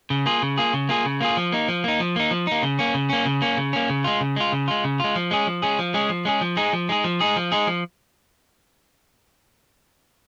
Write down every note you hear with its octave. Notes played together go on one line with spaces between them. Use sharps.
C#3
A#3 F4 G#4
C#3
A#3 F4 G#4
C#3
A#3 F4 G#4
C#3
A#3 F4 G#4
F3
A#3 D#4
F3
A#3 D#4
F3
A#3 D#4
F3
A#3 D#4
C#3
A#3 C#4
C#3
A#3 C#4
C#3
A#3 C#4
C#3
A#3 C#4
C#3
G#3 F4
C#3
G#3 F4
C#3
G#3 F4
C#3
G#3 F4
F3
G#3 C#4 G#4
F3
G#3 C#4 G#4
F3
G#3 C#4 G#4
F3
G#3 C#4 G#4
F3
G#3 D#4 G#4
F3
G#3 D#4 G#4
F3
G#3 D#4 G#4
F3
G#3 D#4 G#4
F3